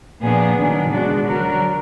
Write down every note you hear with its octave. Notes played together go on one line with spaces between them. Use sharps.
A#2 F3 B3 D4 G#4
D#3 F#3 D4
B2 G#3 D4 F#4
D3 F#3 D4 F#4 A#4